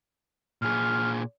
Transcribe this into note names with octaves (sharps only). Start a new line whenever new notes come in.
A#2 G#4 F6